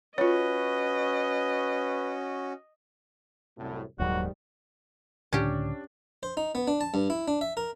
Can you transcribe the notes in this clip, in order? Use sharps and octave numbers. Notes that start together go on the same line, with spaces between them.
C#4 F4 F#4 B4 C#5 D#5
C2 F#2 A2
D#1 D#2 G#2 D#3 F#3 G3 F#4
C#2 A2 D3 C#4 D4 G4
C5
D#4
B3
D4
A5
G2
E4
D4
E5
A#4